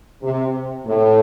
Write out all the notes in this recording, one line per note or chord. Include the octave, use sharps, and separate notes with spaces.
C3
A2